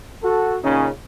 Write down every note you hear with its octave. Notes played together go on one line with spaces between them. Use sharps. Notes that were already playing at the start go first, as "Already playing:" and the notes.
F#4 A4
A#2 C#3 C#4 D#4